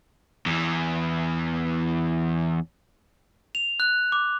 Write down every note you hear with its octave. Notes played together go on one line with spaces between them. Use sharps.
E2 E3
F7
F#6
D6